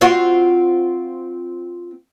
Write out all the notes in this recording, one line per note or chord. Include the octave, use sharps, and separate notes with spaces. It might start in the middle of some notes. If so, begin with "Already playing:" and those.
C4 F4 F#4